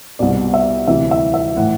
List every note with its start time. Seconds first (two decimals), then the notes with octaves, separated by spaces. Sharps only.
0.19 C2 B2 D5
0.54 E5
0.87 D2 C3 E3 E5
1.11 E5
1.34 E5
1.57 A2 E3 F#5